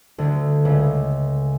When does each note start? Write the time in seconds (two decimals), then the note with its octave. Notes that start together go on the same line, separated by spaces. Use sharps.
0.18 D2 D3
0.65 C#2 C#3